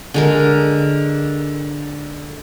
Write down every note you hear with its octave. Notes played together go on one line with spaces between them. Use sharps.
D3 G#3 A#4